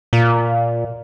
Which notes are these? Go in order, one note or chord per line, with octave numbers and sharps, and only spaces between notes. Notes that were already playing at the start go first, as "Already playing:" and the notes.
A#2